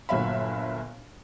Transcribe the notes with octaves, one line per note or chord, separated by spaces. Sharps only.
G1 A#2 F#3 E5 F5 B5